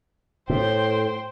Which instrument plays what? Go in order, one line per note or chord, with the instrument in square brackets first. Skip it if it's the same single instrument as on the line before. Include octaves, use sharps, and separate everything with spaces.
[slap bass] A2 [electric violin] C5 G5